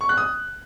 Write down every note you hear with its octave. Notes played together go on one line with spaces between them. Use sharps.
C#6
F#6
D#6